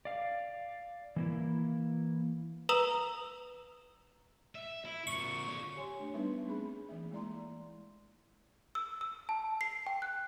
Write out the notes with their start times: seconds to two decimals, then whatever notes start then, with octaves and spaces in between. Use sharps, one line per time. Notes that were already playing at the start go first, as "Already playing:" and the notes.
0.05 D5 F5
1.16 E3 A#3 E4
2.69 B4 A#5 D#6 E6 F7 F#7
4.55 E5
4.85 E4
5.07 F2 A#2 C#6
5.46 D3 C#5
5.76 G4 C#5 G#5 C6
5.99 A3 D4
6.14 G3 B3 D4 D#4 B4 E5
6.46 A3 C4 D4 G#4 B5
6.89 E3 A#3 E5
7.11 G#3 A#3 E4 D5 A#5 C6
8.75 E6
9.01 E6
9.29 A5
9.61 C7
9.87 G5
10.02 F#6